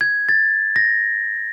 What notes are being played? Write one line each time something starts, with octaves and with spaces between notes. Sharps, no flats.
G#6
A6
A#6